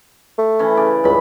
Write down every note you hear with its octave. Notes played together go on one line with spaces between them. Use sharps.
A3
E3 C#4
C#3 D5
C#2 G2 B5